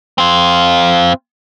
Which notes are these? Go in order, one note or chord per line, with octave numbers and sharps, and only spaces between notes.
C4 F4